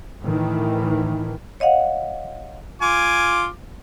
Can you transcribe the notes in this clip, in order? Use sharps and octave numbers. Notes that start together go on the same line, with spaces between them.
A2 D#3 E3
C#5 D#5 F5 F#5
F4 G#5 D6